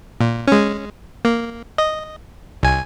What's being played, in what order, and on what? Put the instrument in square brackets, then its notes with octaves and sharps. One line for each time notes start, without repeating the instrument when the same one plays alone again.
[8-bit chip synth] A#2
G#3 C#4
A#3
D#5
C2 G#5